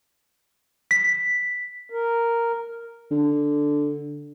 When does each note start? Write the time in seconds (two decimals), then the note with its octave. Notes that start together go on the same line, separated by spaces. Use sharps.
0.91 B6
1.90 A#4
3.11 D3